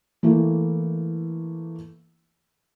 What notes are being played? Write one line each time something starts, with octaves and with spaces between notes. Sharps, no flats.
E3 A3 A#3 E4